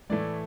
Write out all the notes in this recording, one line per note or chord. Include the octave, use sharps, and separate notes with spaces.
A2 E3 A3 E4 D5